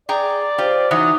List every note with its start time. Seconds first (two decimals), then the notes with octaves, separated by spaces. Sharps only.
0.09 G#4 D5 G5 A#5
0.58 F4 G4 C5
0.91 E3 F#3 D#4 D6 D#6